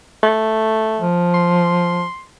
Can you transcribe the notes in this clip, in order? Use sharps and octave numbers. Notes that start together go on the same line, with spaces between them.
A3
F3
C6